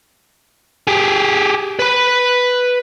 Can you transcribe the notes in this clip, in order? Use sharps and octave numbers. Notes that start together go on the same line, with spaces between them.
G4 G#4
B4 B5